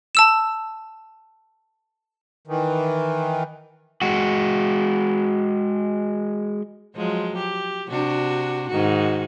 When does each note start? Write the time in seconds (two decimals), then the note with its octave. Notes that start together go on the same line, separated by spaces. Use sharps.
0.15 A5 E6 E7
2.47 D#3 E3
4.02 G#3 F#4
6.96 F3 F#3 G#3
7.37 G4
7.89 C3 D4 F#4
8.69 G#2 D#3 F#4